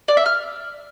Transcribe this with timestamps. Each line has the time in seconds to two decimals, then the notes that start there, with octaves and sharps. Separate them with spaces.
0.08 D5
0.17 E5
0.26 F6